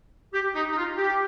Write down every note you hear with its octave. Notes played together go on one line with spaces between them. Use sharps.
G4
D#4
D#4
F4
G4